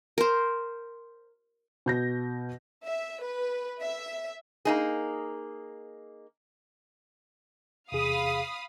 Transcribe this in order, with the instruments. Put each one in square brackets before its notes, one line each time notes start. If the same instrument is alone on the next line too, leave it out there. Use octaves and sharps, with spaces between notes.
[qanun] A#4 C5
[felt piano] B2 G6 A#6
[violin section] E5
B4
E5
[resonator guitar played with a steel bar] A#3 D#4 G#4
[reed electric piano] E2 C3 G#4 [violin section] F5 B5 D#6